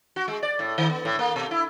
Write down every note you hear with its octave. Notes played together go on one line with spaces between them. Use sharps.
F#4
G#3
D5
A2
D#3
B3
A2
A#3
B2
E4